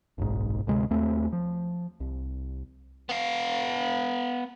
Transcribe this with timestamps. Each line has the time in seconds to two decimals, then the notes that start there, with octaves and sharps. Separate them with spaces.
0.18 F#1 B1 G#2
0.67 D2 C3 G#3
0.91 D#2 A3 C4
1.33 F3
2.00 C2
3.09 B3 F5